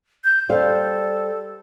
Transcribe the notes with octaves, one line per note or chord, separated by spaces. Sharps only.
G6
G3 A4 C5 F5